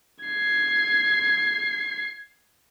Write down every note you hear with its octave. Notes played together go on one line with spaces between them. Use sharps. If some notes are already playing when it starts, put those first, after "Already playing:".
G#6 C7